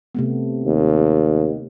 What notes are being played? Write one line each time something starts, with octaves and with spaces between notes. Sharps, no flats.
C3 A3 B3
D#2